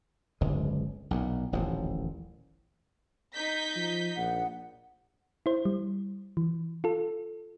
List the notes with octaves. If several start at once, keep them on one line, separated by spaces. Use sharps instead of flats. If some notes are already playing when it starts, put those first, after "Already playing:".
D1 G1 C#2 G#3
B1 A#2
D#1 A1 D2 F3
D#4 G6 B6
F3
A#1 F#5
E4 C5
G3
E3
F4 A4